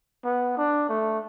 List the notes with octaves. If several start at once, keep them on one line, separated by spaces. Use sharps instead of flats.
B3
D4
A3